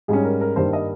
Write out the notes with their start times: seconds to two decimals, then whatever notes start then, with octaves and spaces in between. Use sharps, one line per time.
0.08 G#2 G3 C#4 G#4
0.25 A#4
0.41 A#4
0.56 G2 D#3 G3 A#3 C5
0.73 D#5